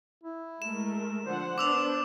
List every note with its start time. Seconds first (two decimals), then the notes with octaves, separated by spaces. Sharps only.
0.24 E4
0.62 G#3 A3 A#4 E7
1.25 D3 F3 C5 F#5
1.58 B3 D4 D6 E6 F7